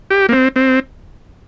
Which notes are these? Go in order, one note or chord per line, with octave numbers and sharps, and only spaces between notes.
G4
A#3
C4
C4